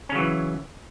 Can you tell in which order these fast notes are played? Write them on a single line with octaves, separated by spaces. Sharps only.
C#4 C#3 F#3 E3